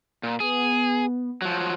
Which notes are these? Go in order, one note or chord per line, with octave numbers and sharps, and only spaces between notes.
A#2
B3 G#4
F3 F#3